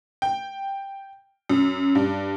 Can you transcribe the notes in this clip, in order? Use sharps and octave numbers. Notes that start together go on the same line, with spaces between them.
G5
F#2
G2